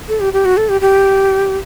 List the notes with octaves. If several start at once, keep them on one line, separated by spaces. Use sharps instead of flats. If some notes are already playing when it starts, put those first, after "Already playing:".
A4
G4
G4
F#4
A4
G4
G4